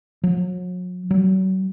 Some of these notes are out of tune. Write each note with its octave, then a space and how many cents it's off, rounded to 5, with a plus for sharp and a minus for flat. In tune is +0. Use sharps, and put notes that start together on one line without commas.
F#3 -40
F#3 +35